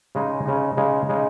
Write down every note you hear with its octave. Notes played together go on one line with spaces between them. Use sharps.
C#3 G#3 D#4
C#3 G#3 D#4
C#3 G#3 D#4
C#3 G#3 D#4